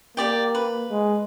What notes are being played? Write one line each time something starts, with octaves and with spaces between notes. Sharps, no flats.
A#3 G4 D5 G5
B4
G#3